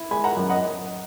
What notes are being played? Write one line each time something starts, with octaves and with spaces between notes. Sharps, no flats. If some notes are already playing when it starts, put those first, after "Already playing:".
Already playing: E4
G#3 G#5 B5
F#5 A#5
F#2
D#5 F#5